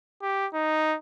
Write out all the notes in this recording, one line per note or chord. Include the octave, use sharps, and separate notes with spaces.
G4
D#4